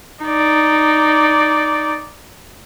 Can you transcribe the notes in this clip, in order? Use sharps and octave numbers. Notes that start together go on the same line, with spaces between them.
D#4 D5